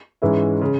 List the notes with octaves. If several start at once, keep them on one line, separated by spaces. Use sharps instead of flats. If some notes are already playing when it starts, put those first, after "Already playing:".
G#2 E3 G#3 C#4 E4
C#3